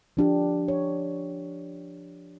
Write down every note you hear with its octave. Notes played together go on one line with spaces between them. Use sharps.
F3 D4 G4
C#5